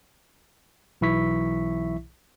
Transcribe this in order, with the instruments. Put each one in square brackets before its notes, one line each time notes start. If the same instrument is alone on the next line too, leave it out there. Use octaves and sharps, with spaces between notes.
[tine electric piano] B1 E3 E4 E5 C#6 B6